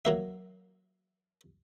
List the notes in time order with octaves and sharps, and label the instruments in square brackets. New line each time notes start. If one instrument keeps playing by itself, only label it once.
[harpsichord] F#3 A#3 E5